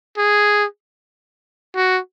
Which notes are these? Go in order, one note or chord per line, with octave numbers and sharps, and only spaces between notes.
G#4
F#4